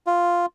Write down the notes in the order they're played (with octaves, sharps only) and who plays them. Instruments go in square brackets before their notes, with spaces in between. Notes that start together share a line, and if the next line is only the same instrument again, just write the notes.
[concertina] F4